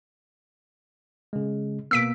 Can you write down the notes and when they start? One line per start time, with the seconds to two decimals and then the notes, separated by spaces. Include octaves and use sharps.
1.33 C#3 G#3
1.91 B2 A#3 B3 E6 B6 D7